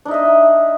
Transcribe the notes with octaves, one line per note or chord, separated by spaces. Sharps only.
D4 D#4 D#5 E5